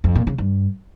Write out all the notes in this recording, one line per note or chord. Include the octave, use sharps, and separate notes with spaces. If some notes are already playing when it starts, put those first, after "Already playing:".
F2
A#2
C#3
G2